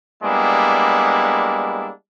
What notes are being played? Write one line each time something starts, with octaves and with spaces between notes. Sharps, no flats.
G3 G#3 A#3 B3 D4 E4